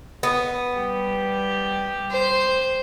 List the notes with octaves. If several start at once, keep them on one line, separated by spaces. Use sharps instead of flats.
B3
G3 G4
C5